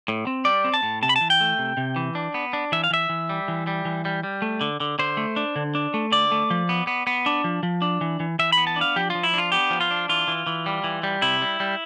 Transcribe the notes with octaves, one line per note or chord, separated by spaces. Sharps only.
A2
C4
G3 D5
C4
A5
A2
C3 A5
B5
A5
E3
G5
A3
C3
C3
E3
D4
B3
D4
E3 E5
F5
E3 E5
E3
G3
E3
G3
E3
G3
G3
A3
D3
D3
D3 C5
A3
D4
D3
D4
A3
D3 D5
A3
F3
B3
B3
B3
D4
F3
F3
D4
E3
E3
E3 E5
B5
B3
A5
D4
F5
F3 G4
F3 F4
E4
D4 F4
B3 G4
F3
F4
D4
E3 F4
E3
E3
G3
E3
G3
C3 E4
G3
G3